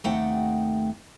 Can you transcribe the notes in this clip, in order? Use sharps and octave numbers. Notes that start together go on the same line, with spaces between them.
D#2 C3 A3 D#4 F#5 G5